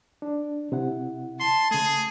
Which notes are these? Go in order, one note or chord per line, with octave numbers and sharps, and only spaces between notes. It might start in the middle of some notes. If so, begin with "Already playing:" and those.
D4
C3 E4 F#5
A5 C6
C#3 A3 G#4